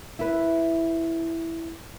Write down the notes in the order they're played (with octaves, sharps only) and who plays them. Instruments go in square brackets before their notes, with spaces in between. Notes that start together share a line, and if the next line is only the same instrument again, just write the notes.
[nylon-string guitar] E4 B4